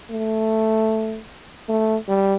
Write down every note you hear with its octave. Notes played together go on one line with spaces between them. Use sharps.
A3
A3
G3